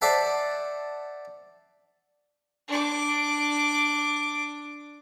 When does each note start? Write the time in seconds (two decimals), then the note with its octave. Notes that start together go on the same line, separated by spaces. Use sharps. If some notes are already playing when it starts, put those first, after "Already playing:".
0.01 A4 C5 D5 E5 F#5 A5
2.68 D4 D6